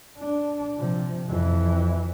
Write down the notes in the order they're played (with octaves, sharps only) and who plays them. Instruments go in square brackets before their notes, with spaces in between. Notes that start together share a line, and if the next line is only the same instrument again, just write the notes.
[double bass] D4
C3 F3
F2 E3